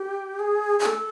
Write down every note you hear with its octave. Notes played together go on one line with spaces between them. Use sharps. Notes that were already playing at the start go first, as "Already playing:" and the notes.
Already playing: G4
G#4
G#4
A4